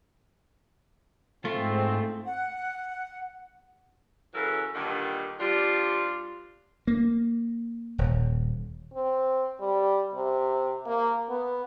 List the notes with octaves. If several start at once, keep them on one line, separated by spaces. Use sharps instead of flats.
G#2 A3 C4 F4
F#5
C#3 E3 F#3 A4 A#4
G2 A#2 D3 D#3
F3 G3 D4 F4
A#3
D#1
C4
G3
C3
A#3
B3